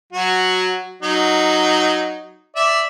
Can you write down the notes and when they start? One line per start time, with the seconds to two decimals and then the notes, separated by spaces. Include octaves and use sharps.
0.13 F#3 F#4
1.03 F#3 D#4
2.56 D5 E5